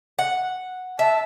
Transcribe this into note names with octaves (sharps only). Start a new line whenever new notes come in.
F#5
E5 A5